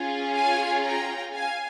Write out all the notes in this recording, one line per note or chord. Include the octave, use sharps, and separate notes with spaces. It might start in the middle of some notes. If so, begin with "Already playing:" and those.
Already playing: C#4 F4 G#4
F5 G#5
G5 A#5
F5 G#5